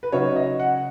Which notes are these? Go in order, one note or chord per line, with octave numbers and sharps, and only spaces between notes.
B4
C#3 F#3 D#4 C#5
D#5
F#5